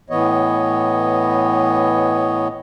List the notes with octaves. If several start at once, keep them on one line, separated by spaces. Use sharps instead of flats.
A2 E3 B3 C#5 D#5